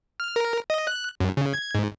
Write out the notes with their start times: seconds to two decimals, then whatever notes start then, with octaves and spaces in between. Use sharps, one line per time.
0.20 F6
0.36 A#4
0.70 D#5
0.87 F#6
1.20 F#2
1.37 C#3
1.54 G#6
1.75 G#2